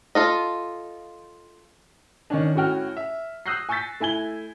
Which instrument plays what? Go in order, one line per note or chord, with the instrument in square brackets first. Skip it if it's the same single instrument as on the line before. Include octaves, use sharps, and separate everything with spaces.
[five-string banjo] F4 A4 D#5
[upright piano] D#3 C#4 D4
A2 C#4 F#4 G5 F6
E5
D#6 E6 F#6 G6 A#6 C7
G#5 C#6 E6 G6 A6 B6
A3 E4 G#5 G#6 G7